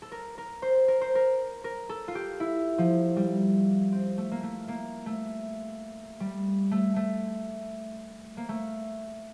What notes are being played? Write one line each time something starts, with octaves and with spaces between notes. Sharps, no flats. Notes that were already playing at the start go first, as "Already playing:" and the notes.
A4
A#4
A#4
C5
A#4
C5
A#4
A#4
A4
F4
G4
E4
F3
G3
C4
A3
A#3
A3
A#3
A3
G3
A3
A3
A#3
A3